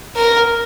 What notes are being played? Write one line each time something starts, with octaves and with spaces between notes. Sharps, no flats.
A#4